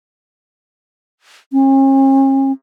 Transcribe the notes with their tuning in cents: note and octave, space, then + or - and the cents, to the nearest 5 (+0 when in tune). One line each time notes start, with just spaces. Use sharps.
C#4 -45